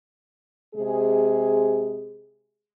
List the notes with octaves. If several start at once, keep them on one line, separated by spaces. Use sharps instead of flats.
C3 G#3 G#4